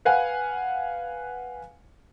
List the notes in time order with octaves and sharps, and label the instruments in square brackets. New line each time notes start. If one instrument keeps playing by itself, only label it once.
[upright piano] B4 F5 F#5 G#5